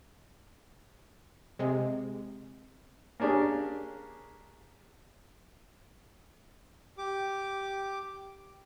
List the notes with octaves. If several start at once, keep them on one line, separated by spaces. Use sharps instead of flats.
C3 G#3
A#3 C#4 D4 G4 G#4
G4 D6